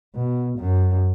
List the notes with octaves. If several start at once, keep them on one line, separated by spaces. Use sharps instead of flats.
B2
F#2